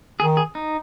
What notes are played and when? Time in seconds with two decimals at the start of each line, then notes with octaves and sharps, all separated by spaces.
0.20 D#3 G#4
0.37 G#4
0.55 D#4